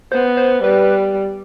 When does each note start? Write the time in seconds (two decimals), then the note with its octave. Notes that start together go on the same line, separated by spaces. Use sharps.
0.12 B3 C5
0.37 C5
0.63 G3 B4